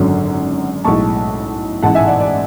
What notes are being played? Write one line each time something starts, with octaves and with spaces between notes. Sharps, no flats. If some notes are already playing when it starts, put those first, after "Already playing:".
Already playing: G#1 F#2 D3 F#3
B1 A2 G#3 A5 C#6
A1 G#2 E3 G#3 F#5 A5
E5 G#5
D5 F#5
D5